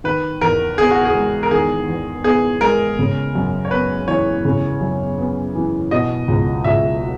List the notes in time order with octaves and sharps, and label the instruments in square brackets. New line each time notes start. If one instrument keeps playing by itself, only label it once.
[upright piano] D#3 [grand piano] B4
[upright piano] E2 [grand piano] A#4
[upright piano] B3 [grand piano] G#4
[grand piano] F#4
G#4
[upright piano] G#3
[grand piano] A#4
[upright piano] D#3 [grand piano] G#4
[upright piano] E2
[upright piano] B3 [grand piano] G#4
[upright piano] G#3 [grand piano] A#4
[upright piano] C#3
F#2
[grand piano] C#5
[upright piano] B3 [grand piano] B4
[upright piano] E3 [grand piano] C#5
[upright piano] C#3
F#2
B3
E3
[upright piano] B2 [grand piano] D#5
[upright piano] C#2
[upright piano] C#2 [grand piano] E5
[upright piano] F#3